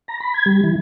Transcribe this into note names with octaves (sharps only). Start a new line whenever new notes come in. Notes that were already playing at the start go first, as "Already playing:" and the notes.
A#5
B5
G#6
G3
E3